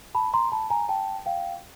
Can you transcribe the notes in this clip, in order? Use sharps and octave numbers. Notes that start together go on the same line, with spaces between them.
A5 B5
A#5 C6
A5 B5
G#5 A#5
G5 A5
F5 G5